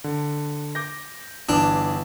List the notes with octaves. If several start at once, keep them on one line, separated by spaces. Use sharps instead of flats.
D3
D6 G6 A#6
G1 E3 D4 E6